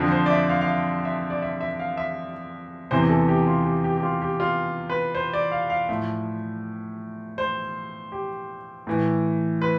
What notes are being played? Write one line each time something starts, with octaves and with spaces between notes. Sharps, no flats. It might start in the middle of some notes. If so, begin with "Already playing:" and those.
Already playing: F2 D3 F3
C5
D5
E5
F5
F5
E5
E5
D5
E5
E5
F5
E5
E2 C3 E3 C5
A4
G4
F4
G4
G4
G4
F4
G4
F4
B4
C5
D5
F5
F5
A2 F3 E5
C5
G4
A2 E3
B4